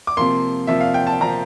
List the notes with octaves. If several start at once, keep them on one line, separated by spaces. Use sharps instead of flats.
D6
C3 F3 A#3 C6
C3 F3 A#3 E5
F5
G5
A5
C3 F3 A#3 A#5